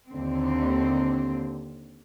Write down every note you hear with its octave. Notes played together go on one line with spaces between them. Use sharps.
D#2 D3 C4